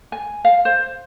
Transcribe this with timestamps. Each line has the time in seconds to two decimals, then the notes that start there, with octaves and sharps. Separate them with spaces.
0.12 G#5
0.45 F5
0.65 C5